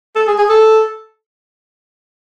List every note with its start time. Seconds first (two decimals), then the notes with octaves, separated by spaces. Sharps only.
0.16 A4
0.27 G#4
0.38 G#4
0.49 A4